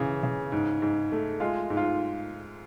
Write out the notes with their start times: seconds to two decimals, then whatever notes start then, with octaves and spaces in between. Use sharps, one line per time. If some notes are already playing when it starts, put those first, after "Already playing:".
Already playing: C#3 E3
0.23 C#3
0.52 G#2
0.82 G#2
1.12 A3
1.40 G#3 F4
1.70 G#2
1.77 F4